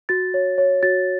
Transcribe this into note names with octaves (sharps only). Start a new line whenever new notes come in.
F#4 A6
C#5
C#5
F#4 A6